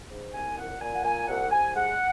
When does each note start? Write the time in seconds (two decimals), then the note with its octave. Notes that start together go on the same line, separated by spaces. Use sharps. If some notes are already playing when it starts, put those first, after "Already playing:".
0.10 G#2
0.34 C2 G#5
0.57 A#2 F#5
0.80 A#2 G#5
0.94 F#5
1.04 A#2 G#5
1.28 C2 F#5
1.50 C2 G#5
1.74 G#3 F#5